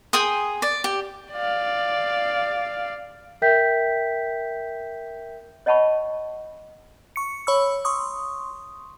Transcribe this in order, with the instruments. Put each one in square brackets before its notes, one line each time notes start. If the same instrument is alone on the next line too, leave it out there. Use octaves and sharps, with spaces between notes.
[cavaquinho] G#4 G5 C6 D#6
D5
G4
[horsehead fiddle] D5 F5
[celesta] A#4 E5 G5 G6 B6
[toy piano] C#5 D#5 F#5 A5 B5 C#6
[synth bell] C#6 C#7
C#5 B5 C#6 E6
C6 C#6 D#6